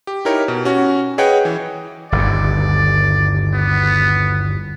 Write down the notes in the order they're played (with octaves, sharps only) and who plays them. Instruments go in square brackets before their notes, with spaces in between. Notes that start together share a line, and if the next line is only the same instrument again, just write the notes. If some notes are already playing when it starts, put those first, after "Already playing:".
[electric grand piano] G4
D#4 E4 G4 A#4 C#5
B2
C#4 F#4
G#4 B4 C#5 D#5 F#5 G5
E3
[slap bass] G1 D#2 [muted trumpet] D5
[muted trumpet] B3